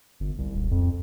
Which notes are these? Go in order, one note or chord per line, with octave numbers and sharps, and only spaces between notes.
G1
C2
D#1
F2